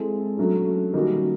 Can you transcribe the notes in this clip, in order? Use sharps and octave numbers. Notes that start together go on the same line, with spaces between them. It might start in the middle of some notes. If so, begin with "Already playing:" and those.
Already playing: G#3 C4 E4 A4
C#3 F#3 A3 D4
D#3 G3 A#3 C#4 F#4